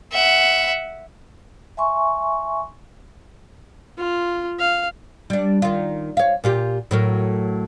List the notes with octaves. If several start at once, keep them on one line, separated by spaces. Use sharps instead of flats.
E5 F#5
E5 G#5 C6 C#6
F4
F5
G3 D4
D#3 F4
C#5 F5
A#2 F4 G4
A2 F#3 A#4